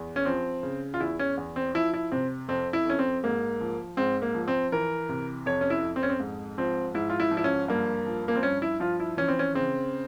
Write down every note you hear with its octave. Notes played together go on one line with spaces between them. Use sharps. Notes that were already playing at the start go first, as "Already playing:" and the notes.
Already playing: E2
C#4
F3 C4
C#3
F4
E2 E4
C#4
E2
C4
F3 E4
E4
C3 C4
F2 C4
E4
F2 C#4
C4
G#2 A#3
F3
G#2 C4
A#3
F3
C4
E3 A#4
C3
F2 C#5
C#4
E4
F2
C4
C#4
C4
G#2
F3 C4
G#2 E4
F4
E4
F3
E4
C#4
G2 A#3
F3
A#3
C4
G2 C#4
E4
F3 F4
E4
E3 C#4
C4
C#4
C#3 C4